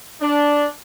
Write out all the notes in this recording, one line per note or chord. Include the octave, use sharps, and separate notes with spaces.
D4